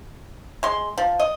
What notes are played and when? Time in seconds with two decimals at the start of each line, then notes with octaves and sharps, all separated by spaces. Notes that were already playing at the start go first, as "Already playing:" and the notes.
0.63 G#3 C6
0.98 F3
1.20 D#5